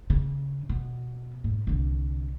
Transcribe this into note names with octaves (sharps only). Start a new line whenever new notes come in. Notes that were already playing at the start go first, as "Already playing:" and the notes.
C#3
B2
G#2
C2 D3